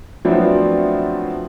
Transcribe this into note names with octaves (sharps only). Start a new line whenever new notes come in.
F3 F#3 A3 B3 C4 D4